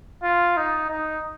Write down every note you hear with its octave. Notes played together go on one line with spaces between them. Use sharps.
F4
D#4
D#4